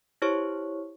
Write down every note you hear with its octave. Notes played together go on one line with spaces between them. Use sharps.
E4 G4 C5 C#5 C#6